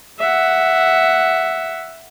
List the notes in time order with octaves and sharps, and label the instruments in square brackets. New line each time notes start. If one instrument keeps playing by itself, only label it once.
[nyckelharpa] E5 F#5